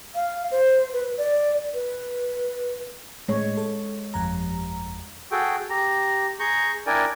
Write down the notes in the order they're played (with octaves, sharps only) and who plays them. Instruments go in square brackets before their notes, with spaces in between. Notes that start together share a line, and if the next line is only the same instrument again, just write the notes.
[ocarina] F5
C5
B4
D5
B4
[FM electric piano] A2 [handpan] G#3 C#5
[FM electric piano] A4
G1 F2 A#5
[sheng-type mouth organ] F#4 G#4 A4 G5
G4 A#5
G#4 A#5 C#6 G6
D4 E4 A#4 D5 G5 G#5